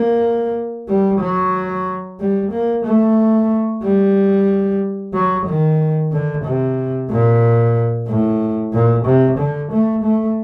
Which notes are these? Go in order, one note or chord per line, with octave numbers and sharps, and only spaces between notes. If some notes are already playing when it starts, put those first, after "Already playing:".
Already playing: A#3
G3
F#3
G3
A#3
A3
G3
F#3
D#3
D3
C3
A#2
A2
A#2
C3
D3
A3
A3